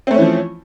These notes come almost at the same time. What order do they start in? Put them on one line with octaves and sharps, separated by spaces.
C4 A3 C#4 E3 F3